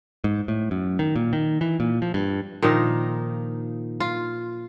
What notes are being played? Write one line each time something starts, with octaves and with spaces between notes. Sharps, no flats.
G#2
A2
F#2
D#3
A#2
D#3
E3
A#2
F3
G2
A#2 D#3 F3 D#4
F4